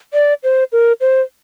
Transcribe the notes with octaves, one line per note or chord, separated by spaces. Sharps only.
D5
C5
A#4
C5